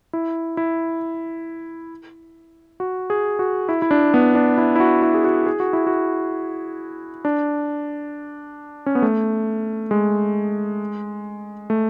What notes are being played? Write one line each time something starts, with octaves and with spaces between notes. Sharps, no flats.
E4
E4
F#4
G#4
F#4
E4
E4
D4
B3
D4
E4
E4
F#4
E4
G#4
F#4
G#4
F#4
E4
F#4
D4
C#4
B3
A3
G#3
A3